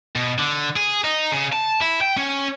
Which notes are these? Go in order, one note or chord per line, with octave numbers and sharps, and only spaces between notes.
B2
D3
G#4
D#4
C#3
A5
E4
G5
C#4